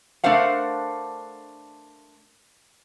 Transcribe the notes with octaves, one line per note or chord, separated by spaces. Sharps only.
A3 D4 A#4 C5 F5 F#5